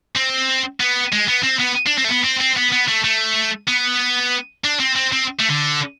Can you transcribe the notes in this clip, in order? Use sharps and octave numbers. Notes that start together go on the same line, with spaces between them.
C4
B3
G#3
B3
C4
B3
D4
C4
A3
B3
C4
C4
B3
B3
A3
A3
B3
D4
C4
C4
C4
A3
D3